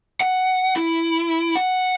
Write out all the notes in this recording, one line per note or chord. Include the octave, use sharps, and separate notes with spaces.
F#5
E4
F#5